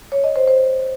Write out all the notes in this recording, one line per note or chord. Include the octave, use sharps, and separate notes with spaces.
C#5
D#5
C5
C5